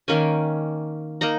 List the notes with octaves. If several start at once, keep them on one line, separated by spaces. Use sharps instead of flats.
D#3 A#3 C#4 G#5
A#3 D#4 A#5